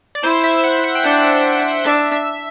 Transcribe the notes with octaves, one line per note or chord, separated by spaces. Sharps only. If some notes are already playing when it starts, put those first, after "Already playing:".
D5
E4 C5
E5
F#5
F#5
G5
D4 F#5
D4 E5
E5